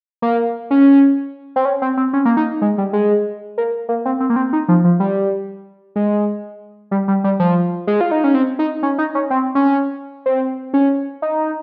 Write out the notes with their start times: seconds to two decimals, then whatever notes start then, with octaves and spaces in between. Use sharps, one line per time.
0.22 A#3
0.71 C#4
1.56 C4
1.65 C#4
1.82 C4
1.97 C4
2.13 C#4
2.25 A#3
2.37 D#4
2.62 G#3
2.78 G3
2.93 G#3
3.58 A#3
3.89 A#3
4.05 C4
4.20 C4
4.30 A#3
4.36 C4
4.53 D#4
4.68 F3
4.84 F3
5.00 G3
5.96 G#3
6.91 G3
7.08 G3
7.24 G3
7.40 F3
7.87 G#3
8.01 F4
8.11 D#4
8.24 C#4
8.35 C4
8.59 D#4
8.83 C#4
8.98 D#4
9.15 C#4
9.30 C4
9.55 C#4
10.26 C4
10.74 C#4
11.22 D#4